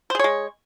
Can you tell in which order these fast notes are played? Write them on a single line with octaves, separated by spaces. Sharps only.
C5 G#4 C#5 G#3